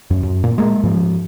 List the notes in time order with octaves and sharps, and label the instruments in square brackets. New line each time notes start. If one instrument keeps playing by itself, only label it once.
[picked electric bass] F#2
F#2
A#2
G#3 A#3
G#2 F3